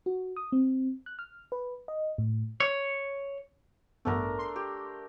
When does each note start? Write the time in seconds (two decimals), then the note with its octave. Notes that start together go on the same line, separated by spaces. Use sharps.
0.06 F#4
0.36 D#6
0.52 C4
1.06 F#6
1.19 F6
1.52 B4
1.88 D#5
2.18 A2
2.60 C#5
4.05 A1 G2 A3 B3 D4 A#4
4.39 C6
4.56 G4